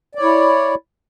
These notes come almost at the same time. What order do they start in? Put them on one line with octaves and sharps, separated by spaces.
D5 C#5 E4